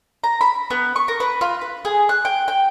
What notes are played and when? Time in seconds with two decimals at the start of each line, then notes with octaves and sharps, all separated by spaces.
0.24 A#5
0.41 B5
0.70 B3
0.96 C#6
1.08 A#4
1.20 B4
1.41 F4
1.62 B4
1.85 G#4
2.09 F#6
2.25 G5
2.48 G5